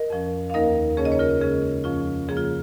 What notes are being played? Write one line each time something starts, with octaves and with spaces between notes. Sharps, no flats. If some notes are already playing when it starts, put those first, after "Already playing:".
Already playing: A#4 D#5
F2 F3 C#4
F5
D#2 D#3 A#3 D#4 A#4 D#5
F2 C#3 A#3 C#4 G#4 C#5
D#5
C#5
F4 A#4
C#3 G#3 C#4 G#4
F2 F3 C#4 F4
C#3 F3 A#3 G#4
F4